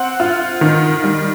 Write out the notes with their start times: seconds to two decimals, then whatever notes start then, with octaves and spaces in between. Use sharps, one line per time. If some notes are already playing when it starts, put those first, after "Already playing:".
Already playing: C4 F#5
0.20 F4
0.61 D#3
1.04 G3